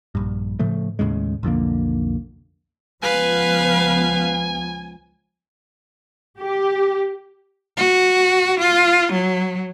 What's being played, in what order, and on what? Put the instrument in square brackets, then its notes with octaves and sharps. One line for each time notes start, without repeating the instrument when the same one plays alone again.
[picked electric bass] A#1 G2
A2 C#3 F3 A3
D#2 A2 C#3 G#3
B1 F2 D3 A#3
[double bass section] C#2 F3 B3 [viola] B4 F5 [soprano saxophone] G#5
[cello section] G4
[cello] F#4
F4
F#3